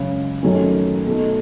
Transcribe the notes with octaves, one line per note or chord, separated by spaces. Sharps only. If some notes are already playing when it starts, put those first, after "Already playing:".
Already playing: F#2 C#3 G#3 C#4
F#2 D#3 F#3 A3 C#4
B2 A3 D#4